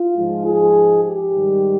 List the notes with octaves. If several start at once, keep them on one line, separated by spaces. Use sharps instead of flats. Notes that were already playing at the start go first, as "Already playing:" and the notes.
Already playing: F4
G#2 F3 G#3
G#4
G4
G#2 D#3 G3